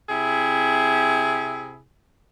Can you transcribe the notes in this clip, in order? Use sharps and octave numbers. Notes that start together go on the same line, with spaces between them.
C3 E4 G#4